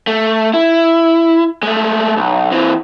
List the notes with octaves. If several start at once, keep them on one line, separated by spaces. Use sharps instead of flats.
A3
E4
G#3 A3
B1
E3 C4